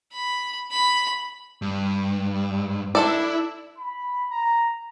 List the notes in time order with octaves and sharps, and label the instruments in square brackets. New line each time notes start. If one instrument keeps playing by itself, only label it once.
[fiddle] B5
B5
[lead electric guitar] G2
[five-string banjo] D4 A4 D5 [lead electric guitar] E4
[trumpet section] B5
A#5